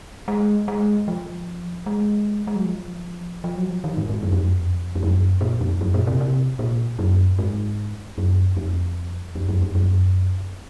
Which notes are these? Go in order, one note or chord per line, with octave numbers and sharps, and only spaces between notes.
G#3
G#3
F3
G#3
G#3
F#3
F3
F3
F#3
F3
D#3
G#2
G#2
F#2
F2
F#2
F2
F2
F#2
A#2
F2
F#2
A#2
C3
C3
A#2
F#2
G#2
F#2
F2
F2
F#2
F2
F#2